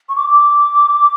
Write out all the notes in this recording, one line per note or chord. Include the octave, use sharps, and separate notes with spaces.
C#6
D6